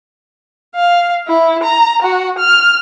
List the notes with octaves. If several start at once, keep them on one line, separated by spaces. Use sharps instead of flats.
F5
E4
A#5
F#4
F6